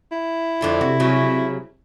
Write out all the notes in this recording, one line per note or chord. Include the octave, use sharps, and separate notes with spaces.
E4
F2 D3 F4
C3 F#4
C#3 F#3